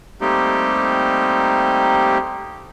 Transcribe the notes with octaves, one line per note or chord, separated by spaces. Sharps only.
G3 A3 A#3 C4 D#4 G4